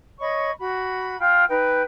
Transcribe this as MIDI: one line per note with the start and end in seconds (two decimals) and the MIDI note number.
0.19 0.49 73
0.19 0.49 75
0.19 0.49 83
0.19 0.49 85
0.58 1.17 66
0.58 1.17 83
1.19 1.44 65
1.19 1.44 79
1.48 1.82 63
1.48 1.82 71
1.48 1.82 79